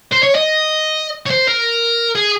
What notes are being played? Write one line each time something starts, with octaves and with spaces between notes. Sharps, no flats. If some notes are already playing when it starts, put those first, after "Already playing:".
C5
C#5
D#5
C#5
C5
A#4
G#4